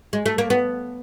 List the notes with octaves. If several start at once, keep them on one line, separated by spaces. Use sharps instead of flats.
G#3
A3
A#3
B3